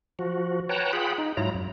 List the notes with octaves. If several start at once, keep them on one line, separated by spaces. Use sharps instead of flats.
F3 F#4
B4 C#5 F#5 G5 A5 A#5
F4 G#4 F#5 G5 B5
D#4
G#2 F#3 E4 F4 A#5
F#2